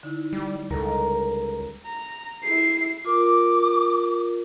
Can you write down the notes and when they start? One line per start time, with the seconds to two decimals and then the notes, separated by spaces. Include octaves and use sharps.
0.03 D3 D#4 E4
0.33 G3
0.71 C#2 G3 A4 A#4
1.85 A#5
2.43 E4 C7
3.05 F4 A#4 D6